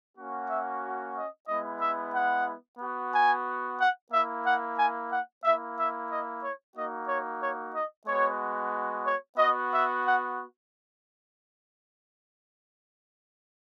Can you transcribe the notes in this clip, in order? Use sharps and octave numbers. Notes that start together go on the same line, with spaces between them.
A#3 C#4 F#4
E5
D#5
G#3 B3 E4 D#5
E5
F#5
B3 F#4
G#5
F#5
A#3 E4 E5
F#5
G#5
F#5
A#3 E4 E5
E5
D#5
C#5
A#3 D#4 F#4 D#5
C#5
C#5
D#5
G#3 B3 F#4 C#5
C#5
B3 F#4 D#5
E5
F#5